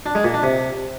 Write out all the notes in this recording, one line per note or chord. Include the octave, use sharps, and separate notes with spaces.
D4
G#3
A#2
D4
C3